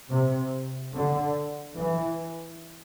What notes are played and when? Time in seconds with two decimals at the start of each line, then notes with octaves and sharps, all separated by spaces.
0.11 C3
0.95 D3
1.78 E3